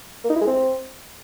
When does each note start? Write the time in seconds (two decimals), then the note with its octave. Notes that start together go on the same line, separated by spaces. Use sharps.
0.24 A#3
0.30 D#4
0.35 E4
0.41 G#3
0.47 C4